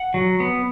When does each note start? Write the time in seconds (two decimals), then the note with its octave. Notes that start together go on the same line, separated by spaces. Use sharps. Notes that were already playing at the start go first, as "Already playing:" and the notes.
Already playing: F#5
0.14 F#3
0.40 B3